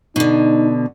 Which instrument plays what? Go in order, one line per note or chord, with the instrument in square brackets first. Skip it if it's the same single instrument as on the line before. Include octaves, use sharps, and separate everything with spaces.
[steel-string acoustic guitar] B2 D3 [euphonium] D#4